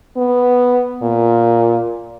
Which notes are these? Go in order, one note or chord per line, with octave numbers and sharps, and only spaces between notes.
B3
A#2